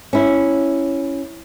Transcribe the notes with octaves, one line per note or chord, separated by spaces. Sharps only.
C#4 E4